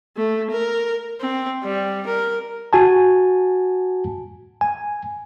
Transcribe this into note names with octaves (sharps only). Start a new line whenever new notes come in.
A3
A#4
C4
G3
A#4
F#4 G#5 A5
G#5